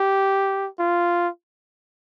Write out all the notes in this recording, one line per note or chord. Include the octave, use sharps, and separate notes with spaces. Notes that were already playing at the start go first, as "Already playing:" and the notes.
Already playing: G4
F4